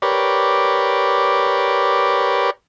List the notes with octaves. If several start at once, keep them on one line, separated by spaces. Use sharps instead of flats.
G4 A#4 B4 C#5 D5